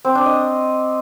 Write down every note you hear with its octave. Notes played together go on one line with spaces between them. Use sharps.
C4
D4
D#5